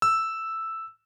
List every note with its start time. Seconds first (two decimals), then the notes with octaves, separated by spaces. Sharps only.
0.02 E6